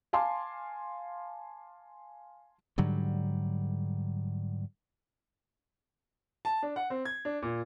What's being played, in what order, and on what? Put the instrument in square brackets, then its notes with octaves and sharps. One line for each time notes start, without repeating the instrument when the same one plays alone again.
[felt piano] F5 G#5 A5 C6 D6
[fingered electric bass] G#2 D3 F#3 G3
[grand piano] A5
D4
F#5
C4
G#6
D4
A#2